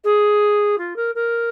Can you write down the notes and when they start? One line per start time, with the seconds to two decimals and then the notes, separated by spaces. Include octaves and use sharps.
0.04 G#4
0.78 F4
0.96 A#4
1.15 A#4